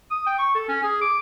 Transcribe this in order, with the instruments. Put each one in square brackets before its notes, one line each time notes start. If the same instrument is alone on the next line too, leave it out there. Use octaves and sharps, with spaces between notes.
[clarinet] D#6
G5
C#6
A4
C#4
G#4
D6